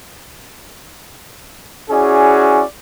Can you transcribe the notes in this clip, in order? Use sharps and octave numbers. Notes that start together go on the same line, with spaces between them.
C#4 E4 F#4 G#4 D5